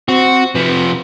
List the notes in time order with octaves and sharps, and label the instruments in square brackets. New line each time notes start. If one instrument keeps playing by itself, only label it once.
[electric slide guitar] C4 [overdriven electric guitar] F#4
[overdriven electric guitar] C3 F3 [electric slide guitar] B4